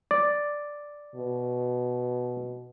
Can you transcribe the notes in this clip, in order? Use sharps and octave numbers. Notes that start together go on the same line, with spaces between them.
D5
B2